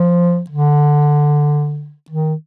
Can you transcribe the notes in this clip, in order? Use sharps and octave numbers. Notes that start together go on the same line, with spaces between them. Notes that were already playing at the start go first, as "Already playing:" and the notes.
Already playing: F3
D3
D#3